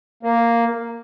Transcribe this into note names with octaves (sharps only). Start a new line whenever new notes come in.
A#3